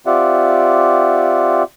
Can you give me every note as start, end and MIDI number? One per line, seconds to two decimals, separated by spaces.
0.06 1.63 60
0.06 1.63 65
0.06 1.63 67
0.06 1.63 74
0.06 1.63 76
0.06 1.63 78